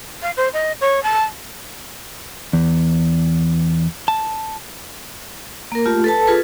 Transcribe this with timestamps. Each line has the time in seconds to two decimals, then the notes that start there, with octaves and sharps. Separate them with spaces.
0.22 F5
0.36 C5
0.53 D#5
0.81 C#5
1.03 A5
2.53 E2
4.08 A5
5.72 A#3 A#4
5.86 A3 F4 G4
6.04 A4 B4 A5
6.27 F4 G#4 A4 B4